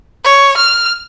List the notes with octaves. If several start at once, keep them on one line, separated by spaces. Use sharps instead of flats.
C#5
F6